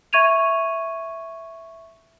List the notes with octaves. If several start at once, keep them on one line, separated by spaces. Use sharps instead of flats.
E5 C#6 G#6 D#7 F7